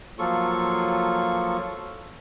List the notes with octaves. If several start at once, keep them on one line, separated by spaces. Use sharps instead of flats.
F3 F#3 A#3 F4 A4 C#6